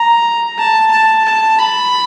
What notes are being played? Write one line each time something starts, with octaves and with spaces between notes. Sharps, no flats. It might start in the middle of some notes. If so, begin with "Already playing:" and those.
Already playing: A#5
A5
A5
A5
B5